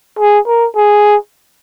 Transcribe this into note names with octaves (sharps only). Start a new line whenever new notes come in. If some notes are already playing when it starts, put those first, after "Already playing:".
G#4
A#4
G#4